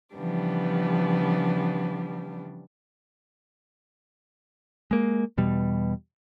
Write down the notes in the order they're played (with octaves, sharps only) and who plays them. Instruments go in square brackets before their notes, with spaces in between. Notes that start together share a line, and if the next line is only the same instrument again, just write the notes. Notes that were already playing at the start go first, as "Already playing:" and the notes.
[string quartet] C#3 E3 F3 G3 B3 D4
[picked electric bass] G#3 A#3
E2 B2 G3